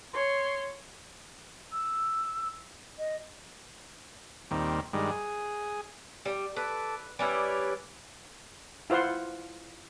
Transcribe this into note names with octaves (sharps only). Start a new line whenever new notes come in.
C#5 C6
E6
D#5
D#2 A#2 D#3 G3 C4
G2 D#3 G3 G#3
G#4
G3
A4 B4 D6
G3 C#4 E4 B4 D5
E4 F4 C5 F#5 C6